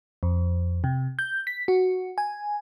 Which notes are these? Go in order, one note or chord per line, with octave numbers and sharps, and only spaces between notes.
F2
C3
G6
B6
F#4
G#5